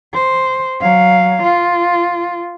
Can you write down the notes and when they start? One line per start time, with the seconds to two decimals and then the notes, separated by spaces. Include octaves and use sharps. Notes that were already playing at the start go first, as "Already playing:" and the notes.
0.14 C5
0.82 F#3 F5
1.43 F4